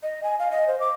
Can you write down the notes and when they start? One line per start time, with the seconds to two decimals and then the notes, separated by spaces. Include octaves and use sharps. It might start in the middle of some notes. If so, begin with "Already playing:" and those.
0.03 D#5
0.23 G#5
0.39 F5
0.51 D#5
0.68 C5
0.80 D6